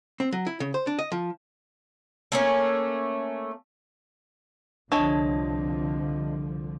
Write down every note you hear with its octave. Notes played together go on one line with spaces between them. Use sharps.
C4
F#3
E4
C#3
C5
D4
D#5
F3
A3 A#3 C#4
C2 D3 F3 D4 A4 C#5 D#5 G#5